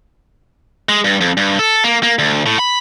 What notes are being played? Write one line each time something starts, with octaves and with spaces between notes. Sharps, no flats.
G#3
G2
F2
G2
A4
A#3
A#3
D2
A2
B5